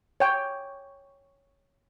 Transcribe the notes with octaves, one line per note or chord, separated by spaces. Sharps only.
C#5 G5